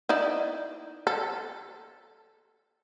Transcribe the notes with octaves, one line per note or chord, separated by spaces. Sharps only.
D#4 E4 D5
A4